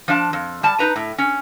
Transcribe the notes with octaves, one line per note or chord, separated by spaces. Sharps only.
F3 D4 E5 A5
F2
G3 A5
D#4 B4 A#5
A2
C#4